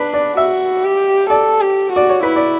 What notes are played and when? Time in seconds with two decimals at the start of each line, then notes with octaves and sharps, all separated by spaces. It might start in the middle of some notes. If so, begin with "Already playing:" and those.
Already playing: D4 B4
0.14 D5
0.37 F#4 E5
0.84 G4
1.30 A4 D5
1.61 G4
1.92 F#4 D5
2.09 C#5
2.23 E4 B4
2.36 D5